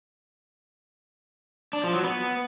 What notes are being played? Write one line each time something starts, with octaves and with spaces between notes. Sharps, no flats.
D4
F3
F#3
B3